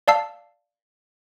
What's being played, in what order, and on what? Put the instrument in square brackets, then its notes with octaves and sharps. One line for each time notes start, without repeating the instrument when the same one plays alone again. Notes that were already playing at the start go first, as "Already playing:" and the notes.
[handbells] D5 F5 A5 E6 C7